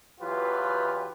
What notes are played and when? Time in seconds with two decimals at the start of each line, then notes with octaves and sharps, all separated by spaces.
0.20 E2 E3 F#3 F4 G4 B4